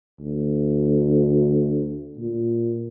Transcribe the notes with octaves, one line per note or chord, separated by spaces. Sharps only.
D2
A#2